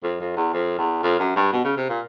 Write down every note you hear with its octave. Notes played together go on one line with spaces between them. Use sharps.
F2
F2
E2
F2
E2
F2
F#2
G2
B2
C#3
C3
A#2